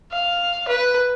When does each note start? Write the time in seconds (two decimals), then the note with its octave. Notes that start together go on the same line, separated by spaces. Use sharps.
0.12 F5
0.68 B4